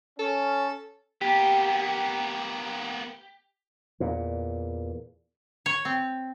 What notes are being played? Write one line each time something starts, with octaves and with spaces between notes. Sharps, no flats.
C#4 A4
A#3 B3 G4
E2 A#2
C#5
C4